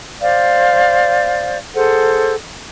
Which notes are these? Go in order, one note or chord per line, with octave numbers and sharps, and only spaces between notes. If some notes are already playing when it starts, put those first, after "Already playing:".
C5 D5 F5 G6
G#4 A4 C5 F#5